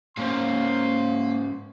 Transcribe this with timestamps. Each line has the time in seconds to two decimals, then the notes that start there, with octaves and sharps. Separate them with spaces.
0.17 G#2 A#3 C#4 C5 F5 C6